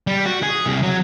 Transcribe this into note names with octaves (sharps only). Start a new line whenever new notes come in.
G3
F#4
G#4
C2
F#3